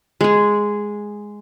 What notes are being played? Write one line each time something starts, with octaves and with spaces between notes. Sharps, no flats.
G#3 G#4